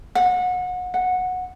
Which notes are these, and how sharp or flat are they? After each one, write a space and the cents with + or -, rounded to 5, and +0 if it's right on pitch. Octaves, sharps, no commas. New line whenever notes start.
F#5 -30
F#5 -15